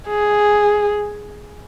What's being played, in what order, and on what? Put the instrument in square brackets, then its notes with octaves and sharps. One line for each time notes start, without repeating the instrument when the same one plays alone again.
[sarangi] G#4